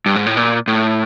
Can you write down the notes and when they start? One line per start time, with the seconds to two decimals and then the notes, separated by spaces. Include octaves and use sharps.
0.06 G2
0.16 G#2
0.26 A2
0.37 A#2
0.68 A2